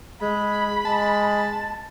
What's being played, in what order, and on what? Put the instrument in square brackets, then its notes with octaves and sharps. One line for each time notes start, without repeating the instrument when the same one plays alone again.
[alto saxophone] G#3 [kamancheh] B5
[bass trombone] G#3 [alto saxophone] A5